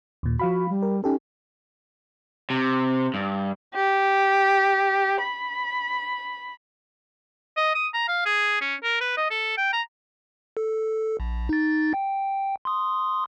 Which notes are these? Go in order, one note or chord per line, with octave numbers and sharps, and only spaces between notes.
D#2 A#2
F3 F#4 F5 B5
G3
A#4
C#4 D#4 G4 A4
C3
G2
G4
B5
D#5
D#6
A#5
F5
G#4
C#4
A#4
B4
D#5
A4
G5
A#5
A4
A#1
D#4 A6
G5
C6 D#6